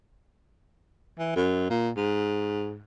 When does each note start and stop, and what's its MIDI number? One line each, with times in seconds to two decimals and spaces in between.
1.19 1.32 52
1.36 1.66 42
1.70 1.90 46
1.97 2.82 44